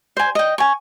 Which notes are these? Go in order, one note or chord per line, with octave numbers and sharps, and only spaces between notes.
C5 G#5
D#5 G5
G#5 C#6